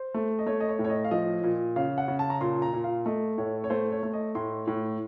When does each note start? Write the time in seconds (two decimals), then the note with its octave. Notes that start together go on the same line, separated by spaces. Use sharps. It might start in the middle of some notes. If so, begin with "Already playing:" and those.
Already playing: C5
0.14 A3
0.39 D#5
0.46 A3 C#5
0.60 D#5
0.69 C#5
0.79 A2
0.84 C#5
0.90 D#5
1.04 F5
1.11 F3 D#5
1.43 A#2
1.76 C#3 F5
1.98 F#5
2.08 C#3
2.19 A5
2.30 A#5
2.41 A#2 C6
2.62 A#5
2.73 A#2
2.84 F5
3.06 A3 D#5
3.38 A2 C#5
3.64 C#5
3.70 A3 C5
3.92 C#5
4.03 A3
4.13 D#5
4.35 A2 C6
4.67 A2